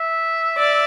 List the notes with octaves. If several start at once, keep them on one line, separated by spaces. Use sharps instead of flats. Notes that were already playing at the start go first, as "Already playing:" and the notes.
Already playing: E5
D5